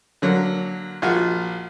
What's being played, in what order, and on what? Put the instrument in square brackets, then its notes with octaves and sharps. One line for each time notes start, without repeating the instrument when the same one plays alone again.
[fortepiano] D3 F#3 A#3
A#1 F4 F#4